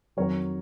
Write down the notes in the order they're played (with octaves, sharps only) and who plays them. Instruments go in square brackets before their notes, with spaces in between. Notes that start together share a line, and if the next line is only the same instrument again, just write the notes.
[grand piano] F2 D#3 F#3 A#4 C#5